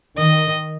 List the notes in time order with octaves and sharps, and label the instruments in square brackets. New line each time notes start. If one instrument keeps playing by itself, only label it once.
[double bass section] D#3 [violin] D#5